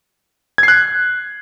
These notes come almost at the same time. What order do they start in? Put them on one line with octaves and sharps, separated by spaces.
G#6 C7 F#6